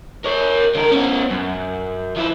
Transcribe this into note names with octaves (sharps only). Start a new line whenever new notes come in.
A#4 C#5
D3 A#4
B3 C#4
F#2
F3 E4